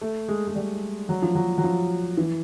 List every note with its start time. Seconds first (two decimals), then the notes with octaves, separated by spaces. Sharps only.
0.01 A3
0.28 G#3
0.47 G#3
0.56 G3
1.09 F#3
1.22 F3
1.35 F#3
1.58 F#3
1.64 F3
2.17 E3